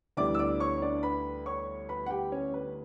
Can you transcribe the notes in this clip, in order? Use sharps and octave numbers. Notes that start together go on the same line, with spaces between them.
D2 D3 G3 B3 E4 D5 D6
E6
D5 D6
C#5 C#6
C#5
D4 D5
B4 B5
C#5 C#6
B4 B5
F#5
G4 G5
C#4 C#5
B4